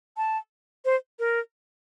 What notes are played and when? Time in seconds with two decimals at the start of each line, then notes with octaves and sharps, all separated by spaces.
0.17 A5
0.85 C5
1.19 A#4